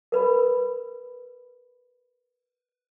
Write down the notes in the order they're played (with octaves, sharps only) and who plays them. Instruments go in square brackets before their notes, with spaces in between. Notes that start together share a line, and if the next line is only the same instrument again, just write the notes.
[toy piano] A#4 B4 B5